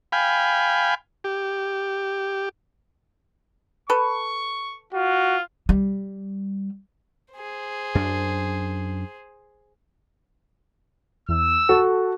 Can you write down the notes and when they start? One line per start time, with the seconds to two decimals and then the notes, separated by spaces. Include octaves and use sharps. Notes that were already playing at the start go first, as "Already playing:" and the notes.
0.12 F5 G5 G#5 B5
1.24 G4
3.90 A4 B4 C#6
4.93 F4 F#4
5.69 G3
7.34 G#4 C5
7.95 F#2 D4
11.29 E2 E6
11.69 F#4 A4